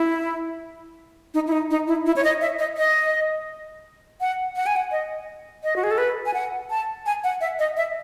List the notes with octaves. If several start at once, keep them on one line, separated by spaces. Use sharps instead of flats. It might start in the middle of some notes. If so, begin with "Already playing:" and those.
Already playing: E4
D#4
E4
D#4
D#4
E4
E4
C#5
D#5
E5
D#5
D#5
F#5
F#5
G#5
F#5
D#5
D#5
F#4
G#4
A4
B4
G#5
F#5
A5
G#5
F#5
E5
D#5
E5